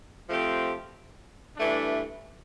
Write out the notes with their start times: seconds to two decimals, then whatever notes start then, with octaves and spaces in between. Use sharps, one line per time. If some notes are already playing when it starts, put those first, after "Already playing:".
0.29 F3 A3 C4 G4
1.57 G2 E3 A3 D4